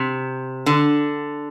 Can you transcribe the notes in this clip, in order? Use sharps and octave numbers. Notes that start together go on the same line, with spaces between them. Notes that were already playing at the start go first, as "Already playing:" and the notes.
Already playing: C3
D3